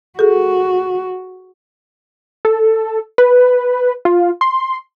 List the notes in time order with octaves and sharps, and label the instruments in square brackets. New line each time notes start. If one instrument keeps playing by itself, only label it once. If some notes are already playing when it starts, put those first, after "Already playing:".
[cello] F#4 [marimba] G#4 A4
[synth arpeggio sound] A4
B4
F4
C6